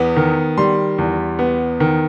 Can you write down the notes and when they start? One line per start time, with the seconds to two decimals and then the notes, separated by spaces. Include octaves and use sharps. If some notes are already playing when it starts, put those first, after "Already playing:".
Already playing: E2 B3
0.16 D#3
0.58 G3 C6
0.98 E2
1.39 B3
1.80 D#3